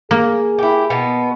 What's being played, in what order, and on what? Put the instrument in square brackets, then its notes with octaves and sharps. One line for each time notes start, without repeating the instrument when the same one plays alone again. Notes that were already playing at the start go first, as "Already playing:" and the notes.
[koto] A#3 [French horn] G#4
[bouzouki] E4 G4
B2 B3